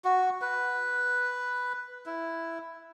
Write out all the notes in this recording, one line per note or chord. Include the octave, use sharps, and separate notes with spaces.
F#4
B4
E4